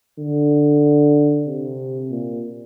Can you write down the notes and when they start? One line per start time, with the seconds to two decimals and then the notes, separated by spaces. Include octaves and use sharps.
0.20 D3
1.47 C3
2.11 A#2